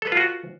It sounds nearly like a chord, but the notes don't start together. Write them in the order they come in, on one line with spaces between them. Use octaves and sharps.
A4 B4 F4 F#4